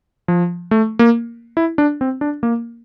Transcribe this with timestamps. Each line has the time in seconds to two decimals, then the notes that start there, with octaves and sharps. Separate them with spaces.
0.28 F3
0.71 A3
0.99 A#3
1.57 E4
1.78 D4
2.01 C4
2.21 D4
2.43 A#3